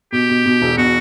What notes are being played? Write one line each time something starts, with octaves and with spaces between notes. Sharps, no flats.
B2 G4
B2
B2
E1
B2 F#4